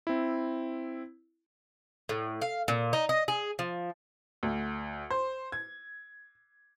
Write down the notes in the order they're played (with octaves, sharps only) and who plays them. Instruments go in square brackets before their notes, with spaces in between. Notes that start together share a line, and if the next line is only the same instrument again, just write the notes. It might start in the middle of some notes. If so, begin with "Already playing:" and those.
[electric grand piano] C4 E4
[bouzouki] A2
F5
A#2
D#4
D#5
G#4
F3
[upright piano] D2
C5
G#6